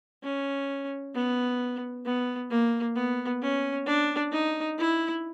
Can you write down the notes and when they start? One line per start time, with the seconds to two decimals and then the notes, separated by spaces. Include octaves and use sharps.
0.24 C#4
1.15 B3
2.06 B3
2.50 A#3
2.95 B3
3.42 C#4
3.86 D4
4.32 D#4
4.78 E4